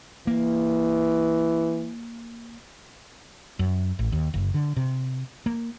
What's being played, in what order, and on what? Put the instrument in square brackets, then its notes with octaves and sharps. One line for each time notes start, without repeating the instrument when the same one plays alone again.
[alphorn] E3 [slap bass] A#3
[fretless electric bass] F#2
A1
D#2
F#1
D3
C3
A#3